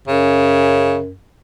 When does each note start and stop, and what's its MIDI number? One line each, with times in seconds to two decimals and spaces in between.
0.08 1.12 42
0.08 0.99 49